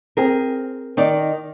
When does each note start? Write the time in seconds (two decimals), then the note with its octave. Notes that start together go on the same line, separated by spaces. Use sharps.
0.17 C4 G#4 A#4
0.97 D#3 D#4 D5